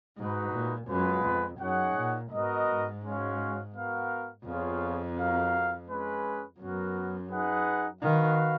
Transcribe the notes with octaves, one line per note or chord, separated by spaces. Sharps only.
G#2 G#3 D#4 F#4 B4
A#2
F#2 G#3 B3 F4 B4
F2
F#2 D#4 G#4 C#5 F#5
A#2
G#2 B3 F#4 A#4 D#5
G#2
G#3 C#4 F#4 C#5 F5
B3 F#4 A#4 F5
F2 B3 F4 G#4 C#5 F5
F#4 A#4 F5
G#3 C#4 G#4 B4
F#2 B3 F#4 A#4
D#4 G#4 B4 F#5
D#3 F#4 B4 F5